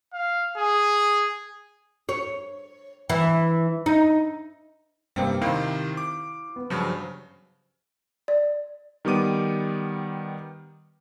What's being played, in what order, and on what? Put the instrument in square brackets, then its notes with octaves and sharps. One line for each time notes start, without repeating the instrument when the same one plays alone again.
[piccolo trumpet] F5
G#4
[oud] C#5
E3
D#4
[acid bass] G2 [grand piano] C3 A#3 C4 [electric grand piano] G3
[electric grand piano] C3 D#3 C4 [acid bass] E4 [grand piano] C5 F5
[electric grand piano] D6
[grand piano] B3
[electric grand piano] G2 C#3 F#3 [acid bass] F3
[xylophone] D5
[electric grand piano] D#3 G3 B3 D6 D#7